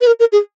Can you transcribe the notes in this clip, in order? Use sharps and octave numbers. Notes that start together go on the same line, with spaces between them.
B4
A#4
A#4
G#4